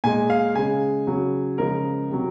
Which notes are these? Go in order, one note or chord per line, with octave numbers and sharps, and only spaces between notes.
A#2 G#3 G#5
F5
C#3 G#3 G#5
C#3 F#3
C#3 F3 G#3 A#4
C3 F#3